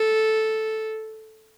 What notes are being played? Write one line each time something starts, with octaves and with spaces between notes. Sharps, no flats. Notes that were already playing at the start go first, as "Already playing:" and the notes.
Already playing: A4